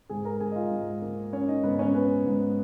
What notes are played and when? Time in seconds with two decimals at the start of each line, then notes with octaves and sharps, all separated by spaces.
0.09 G#2 G#4 G#5
0.25 A#4 A#5
0.40 G#2 G#4 G#5
0.52 D#5
0.56 F4 F5
0.71 G#2
1.02 A#3
1.33 C#4 C#5
1.48 D#4 D#5
1.63 G#2 B3 B4
1.79 C#4 C#5
1.94 B3 C#4 B4
2.25 G#2